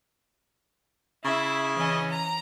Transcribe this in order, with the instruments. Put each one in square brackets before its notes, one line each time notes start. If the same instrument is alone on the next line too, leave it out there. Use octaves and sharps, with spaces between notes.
[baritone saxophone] C#3 [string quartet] E4 E5
[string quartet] E3 C#4 D#5
A#5